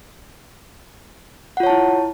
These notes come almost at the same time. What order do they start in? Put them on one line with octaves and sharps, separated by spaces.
F#5 F4 C#5 A5 E4